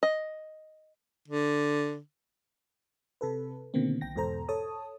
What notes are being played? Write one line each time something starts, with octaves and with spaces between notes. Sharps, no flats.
D#5
D3
C3 A4 B4
B2 D3 D#3 A#3 C4
B1 G5 A#6
E2 G#2 B2 A4 C5 A#5
A4 C#5 A5 D#6